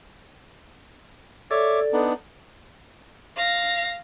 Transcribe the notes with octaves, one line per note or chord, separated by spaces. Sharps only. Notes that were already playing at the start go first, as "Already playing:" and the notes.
A4 C#5 D5 E5 D6
B3 D4 D#4
F5 A#6